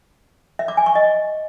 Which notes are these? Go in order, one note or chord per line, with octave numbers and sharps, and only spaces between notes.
E5
D6
G#5
C#6
D#5